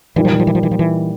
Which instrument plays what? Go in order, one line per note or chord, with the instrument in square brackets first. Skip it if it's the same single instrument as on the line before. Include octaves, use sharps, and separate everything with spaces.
[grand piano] A#2 G3 A#3 D#4 [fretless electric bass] E3
[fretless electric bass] F3
E3
F3
E3
F3
E3
F3
E3